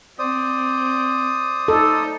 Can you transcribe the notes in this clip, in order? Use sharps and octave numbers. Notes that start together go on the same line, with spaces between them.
C4 C5 D5 D#6
D#4 A4